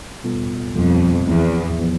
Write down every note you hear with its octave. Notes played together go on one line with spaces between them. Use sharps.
B2 G3 B3 F4 A4
F2 B2 G3 B3 F4 A4
E2 F3 B3 E4
F3 B3 E4